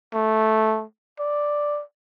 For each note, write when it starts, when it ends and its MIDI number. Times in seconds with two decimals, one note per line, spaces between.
0.14 0.84 57
1.19 1.82 74